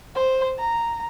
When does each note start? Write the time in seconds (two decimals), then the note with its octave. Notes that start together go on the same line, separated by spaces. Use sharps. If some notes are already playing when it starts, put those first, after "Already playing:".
0.15 C5
0.59 A#5